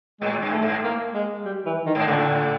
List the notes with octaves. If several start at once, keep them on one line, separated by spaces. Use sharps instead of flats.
A2 G#3
G2
A3
G#2
A#3
G#3
G3
E3
D#3
G#2
A2 D3